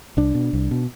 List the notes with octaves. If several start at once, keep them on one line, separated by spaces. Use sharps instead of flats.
C2 D4
B2
C2
B2